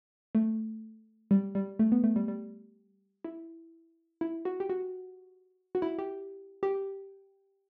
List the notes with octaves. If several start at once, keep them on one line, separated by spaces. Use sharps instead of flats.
A3
G3
G3
A3
B3
A3
G3
G3
E4
E4
F#4
G4
F#4
F#4
E4
G4
G4